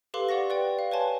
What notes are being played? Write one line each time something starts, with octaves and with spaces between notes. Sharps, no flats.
G4 A4 B4 F5 C6 D6
D5 F#5 C#6 A#6
B4 D5 G5
F5
B4 C#5 G#5 A5 C6